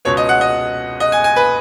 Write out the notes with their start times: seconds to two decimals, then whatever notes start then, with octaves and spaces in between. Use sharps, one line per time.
0.05 C#2 B2 B3 C#5
0.17 D#5
0.29 F#5
0.41 D#5
1.00 D#5
1.12 G#5
1.24 G#5
1.36 B4